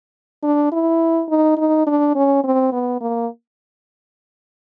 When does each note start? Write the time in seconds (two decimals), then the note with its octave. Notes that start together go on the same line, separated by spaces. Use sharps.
0.43 D4
0.72 E4
1.29 D#4
1.58 D#4
1.87 D4
2.15 C#4
2.44 C4
2.73 B3
3.01 A#3